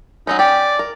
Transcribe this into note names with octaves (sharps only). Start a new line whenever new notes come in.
F#3 G#3 C#4 D#4
C#4 G4 D5
A#4